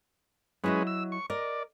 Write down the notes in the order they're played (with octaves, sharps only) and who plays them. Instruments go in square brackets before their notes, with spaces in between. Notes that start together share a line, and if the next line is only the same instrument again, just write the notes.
[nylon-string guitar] F#3 E4 D#5 [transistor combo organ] G#3 C#4 B4
[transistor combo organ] E6
C#6
[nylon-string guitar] A#4 D#5 [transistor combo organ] D5